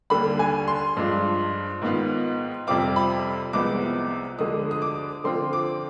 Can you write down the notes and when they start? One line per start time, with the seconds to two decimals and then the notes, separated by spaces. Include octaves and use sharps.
0.10 D#2 D3 G3 B5
0.39 G#5
0.68 C6
0.97 G2 F3 G#3 D4 F4
1.82 G#2 D#3 B3 F4
2.67 F2 C3 G3 C4 F4 D6
2.96 B5
3.53 C2 C3 F3 G#3 B3 D6
4.39 D2 D3 F3 G#3 D#6
4.71 D#6
4.82 D6
5.24 D3 F3 C4 F4 C6
5.53 D6